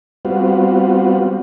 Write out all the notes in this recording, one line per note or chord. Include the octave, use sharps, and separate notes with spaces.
G3 B3 C4 F4 F#4